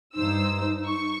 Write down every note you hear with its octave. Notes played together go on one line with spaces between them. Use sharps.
G2 D#4 C5 E6
C#6